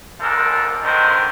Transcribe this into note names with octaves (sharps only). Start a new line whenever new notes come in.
C#2 F#2 F3 D4 A4 A#4
G2 D3 D#3 C4 A#4 C5